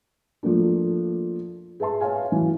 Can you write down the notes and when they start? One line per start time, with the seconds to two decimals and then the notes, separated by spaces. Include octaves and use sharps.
0.43 F3 A3 A#3 D4
1.80 G#4 B4 E5 A5 C6
2.01 C#5 E5 F5 G#5
2.32 E3 F#3